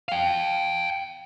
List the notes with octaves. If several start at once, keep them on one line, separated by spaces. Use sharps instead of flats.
F5 G5